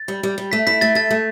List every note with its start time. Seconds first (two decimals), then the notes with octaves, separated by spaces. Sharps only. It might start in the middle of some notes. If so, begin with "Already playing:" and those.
Already playing: A6
0.08 G3
0.23 G3
0.38 G3
0.52 A3 B6
0.67 E4 B6
0.81 A3 A6
0.95 A4 A6
1.11 A3